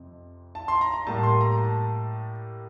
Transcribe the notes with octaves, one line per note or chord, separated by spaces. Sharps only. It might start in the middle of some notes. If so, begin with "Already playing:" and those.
Already playing: F2 C3
A5
C6
A#5
A#5
A2 G3 A#3 A5
C6
A#5
A5